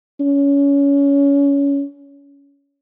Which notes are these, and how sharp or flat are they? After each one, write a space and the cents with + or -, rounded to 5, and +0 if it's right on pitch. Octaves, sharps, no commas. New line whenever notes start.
C#4 +25